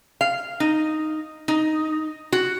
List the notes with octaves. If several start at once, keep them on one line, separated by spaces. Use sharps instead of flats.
F5
D#4
D#4
F#4